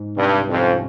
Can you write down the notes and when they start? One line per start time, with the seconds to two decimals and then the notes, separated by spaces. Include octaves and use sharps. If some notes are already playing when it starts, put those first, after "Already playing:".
Already playing: G#2
0.16 G2 C3
0.38 C2
0.49 F2
0.60 C#4